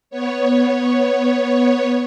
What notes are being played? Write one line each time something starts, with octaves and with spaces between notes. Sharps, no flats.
B3 C#5